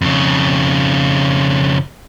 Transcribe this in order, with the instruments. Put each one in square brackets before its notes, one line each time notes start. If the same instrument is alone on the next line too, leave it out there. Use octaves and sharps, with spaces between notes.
[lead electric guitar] F2 C#3